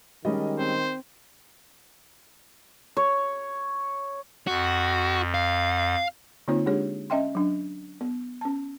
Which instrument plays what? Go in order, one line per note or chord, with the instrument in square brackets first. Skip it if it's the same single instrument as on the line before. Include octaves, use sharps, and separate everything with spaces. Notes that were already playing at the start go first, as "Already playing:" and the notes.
[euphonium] D#3 [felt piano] G3 G#3 C#4 [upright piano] D#5
[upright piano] C4 [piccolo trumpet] C5
[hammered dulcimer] C#5
[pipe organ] F2 [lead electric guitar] F#4
[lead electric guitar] F5
[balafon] D3 A#3 C4 D#4 F4 C#5
G#3 D4 G4 G#4 C#5
C#4 D#5 E5 G5 C6
F#3 D4
B3
C#4 A5